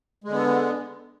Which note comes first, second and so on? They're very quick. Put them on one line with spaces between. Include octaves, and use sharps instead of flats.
G#3 D3 B3